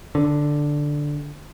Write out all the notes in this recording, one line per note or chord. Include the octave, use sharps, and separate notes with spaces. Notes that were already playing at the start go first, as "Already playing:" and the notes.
D3